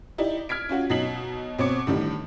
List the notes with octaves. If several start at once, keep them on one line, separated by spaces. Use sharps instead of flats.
D#4 E4 G4 D5
F6 G#6 B6 D7
C#4 F4 F#4
B2 F#3 D#4 B6 C7 F#7
B2 C4 C#5 D6 C#7
A2 D3 D#3 G3